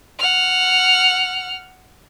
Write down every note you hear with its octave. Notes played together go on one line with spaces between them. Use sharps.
F#5 F6